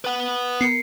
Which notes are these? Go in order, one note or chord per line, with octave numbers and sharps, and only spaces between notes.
B4 F#5
B3 A#4 C7 C#7